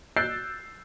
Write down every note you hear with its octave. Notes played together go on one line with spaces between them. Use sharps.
E6 F#6 G6 A6 C7 D7